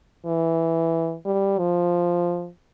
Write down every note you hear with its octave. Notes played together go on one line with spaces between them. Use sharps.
E3
G3
F3